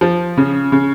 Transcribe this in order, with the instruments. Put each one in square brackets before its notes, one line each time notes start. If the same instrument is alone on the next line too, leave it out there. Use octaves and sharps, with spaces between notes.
[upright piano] F3
C#3
C#3